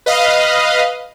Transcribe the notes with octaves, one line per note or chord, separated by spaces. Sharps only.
B4 D#5 F5